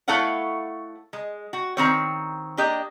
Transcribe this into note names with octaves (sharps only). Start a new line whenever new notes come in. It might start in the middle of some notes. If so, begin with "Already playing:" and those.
A3 E4 A4 C#5 F5 F#5
G#3
F#4
D#3 C4 C#5
A#3 D4 G4 D#5